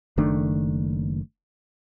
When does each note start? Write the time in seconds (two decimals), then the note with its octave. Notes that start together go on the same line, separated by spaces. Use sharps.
0.17 F#1 D#3 A3 D4